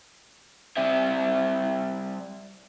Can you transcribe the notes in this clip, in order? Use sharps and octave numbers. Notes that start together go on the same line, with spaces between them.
G3 C4 G4 C5 E5